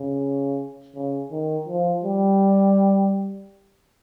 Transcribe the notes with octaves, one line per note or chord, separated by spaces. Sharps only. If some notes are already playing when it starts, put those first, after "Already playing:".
Already playing: C#3
C#3
D#3
F3
G3